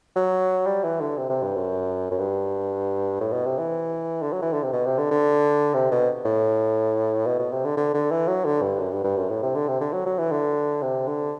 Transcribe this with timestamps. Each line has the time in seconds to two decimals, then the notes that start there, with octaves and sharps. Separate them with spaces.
0.16 F#3
0.66 G3
0.84 E3
1.01 D3
1.17 C3
1.30 C3
1.42 G2
1.55 F#2
2.11 F#2
2.19 G2
3.20 A2
3.33 B2
3.46 C3
3.58 E3
4.22 D3
4.33 F#3
4.42 E3
4.53 D3
4.63 C3
4.73 B2
4.86 C3
4.98 D3
5.11 D3
5.74 C3
5.91 B2
6.25 A2
7.27 B2
7.39 B2
7.52 C3
7.65 D3
7.77 D3
7.94 D3
8.11 E3
8.28 F#3
8.45 D3
8.62 G2
8.79 F#2
8.92 G2
9.04 G2
9.17 F#2
9.30 A2
9.43 C3
9.55 D3
9.68 C3
9.81 D3
9.93 F#3
10.06 F#3
10.19 E3
10.32 D3
10.82 C3
11.07 D3